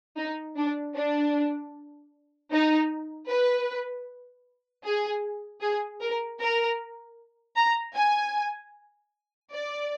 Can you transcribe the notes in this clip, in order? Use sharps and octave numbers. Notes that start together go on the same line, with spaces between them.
D#4
D4
D4
D#4
B4
G#4
G#4
A#4
A#4
A#5
G#5
D5